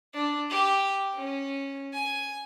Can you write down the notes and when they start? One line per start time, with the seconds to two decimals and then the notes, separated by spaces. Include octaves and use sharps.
0.14 D4
0.50 G4
1.15 C#4
1.93 G#5